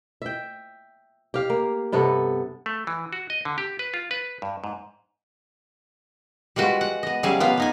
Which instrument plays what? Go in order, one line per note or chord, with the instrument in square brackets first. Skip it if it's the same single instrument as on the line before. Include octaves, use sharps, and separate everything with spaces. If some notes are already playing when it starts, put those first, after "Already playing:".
[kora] E5 G5
G4 F5
A#3
G2 C3 B3 A4
[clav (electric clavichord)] A3
E3
F#4
D#5
D3
G4
B4
F4
B4
G2
G#2
[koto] G3 G#3 F4 F#4 B4
F#5
B3 D#5
C#3 F#3 G3 G#4 F5 G#5
A#3 B3 F4 F5
B3 D#4 G#5